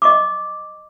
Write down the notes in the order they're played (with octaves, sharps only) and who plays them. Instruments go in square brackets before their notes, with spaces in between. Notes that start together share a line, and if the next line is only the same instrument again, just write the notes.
[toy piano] D#5 C#6 D6